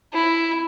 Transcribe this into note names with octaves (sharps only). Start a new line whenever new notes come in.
E4